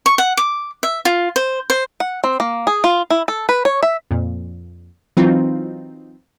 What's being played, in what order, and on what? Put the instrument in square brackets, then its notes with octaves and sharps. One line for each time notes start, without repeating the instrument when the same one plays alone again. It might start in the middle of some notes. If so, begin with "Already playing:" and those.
[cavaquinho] C#6
F#5
D6
E5
F4
C5
C5
[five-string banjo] F#5
C4
A#3
G#4
F4
E4
A4
B4
C#5
E5
[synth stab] F2 A#2
E3 F#3 C4 D#4 F4